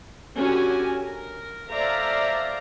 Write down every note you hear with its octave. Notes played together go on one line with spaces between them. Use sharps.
D3 C#4 F#4 G4 G#5
A#4
A4 C5 D5 E5 F5 A#5